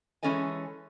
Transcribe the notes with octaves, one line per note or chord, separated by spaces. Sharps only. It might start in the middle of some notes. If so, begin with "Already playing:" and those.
E3 G#3 C#4 A4 D#5 G#5